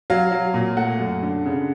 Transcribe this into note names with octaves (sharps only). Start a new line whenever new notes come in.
F#3 F5
F#3
A#2
A3 F#5
F#2
D3
C#3